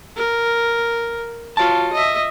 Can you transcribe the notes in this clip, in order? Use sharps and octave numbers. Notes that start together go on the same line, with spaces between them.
A#4
F4 F#4 C#5 A5
D#5 E5